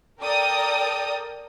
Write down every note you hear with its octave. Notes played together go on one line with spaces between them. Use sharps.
A4 A#4 D5 G5 D#6